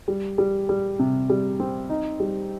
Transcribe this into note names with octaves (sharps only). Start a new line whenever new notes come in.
G3
G3
G3
C3
G3
C4
D#4
G3